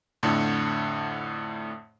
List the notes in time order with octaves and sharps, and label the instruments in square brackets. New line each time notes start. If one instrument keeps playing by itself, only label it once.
[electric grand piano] F2 A2 D3